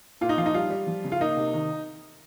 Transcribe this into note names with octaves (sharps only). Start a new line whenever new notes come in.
A#2 F4
D#4
F3 F4
D#4
G3 F4
G3
F3
C#3
F4
A#3 D#4
C3
D#3